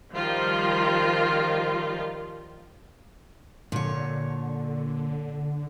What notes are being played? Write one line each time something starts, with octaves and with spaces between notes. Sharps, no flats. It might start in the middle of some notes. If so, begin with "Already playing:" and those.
D#3 F3 G3 F4
A#2 D3 C#5